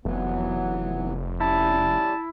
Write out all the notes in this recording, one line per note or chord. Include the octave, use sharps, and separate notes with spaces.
F1 E3 F#3 B3
G3 C#4 E4 D5 A5